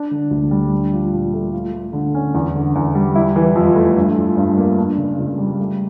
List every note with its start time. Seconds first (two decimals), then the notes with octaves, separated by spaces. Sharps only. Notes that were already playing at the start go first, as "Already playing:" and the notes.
Already playing: D4
0.11 D3
0.31 D2
0.51 G3
0.72 D4
0.93 F3
1.12 A#2
1.33 A3
1.53 F4
1.73 A3
1.93 D3
2.15 C#4
2.34 E2
2.55 D3
2.75 E2
2.95 G3
3.15 E4
3.36 E3
3.55 F2
3.76 A3
3.97 G2
4.16 F3
4.37 G2
4.57 A#3
4.78 D4
4.98 C#3
5.18 C#2
5.38 G3
5.59 A3